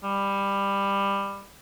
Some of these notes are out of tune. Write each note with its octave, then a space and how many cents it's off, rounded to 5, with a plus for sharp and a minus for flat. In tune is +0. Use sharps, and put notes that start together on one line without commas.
G3 +15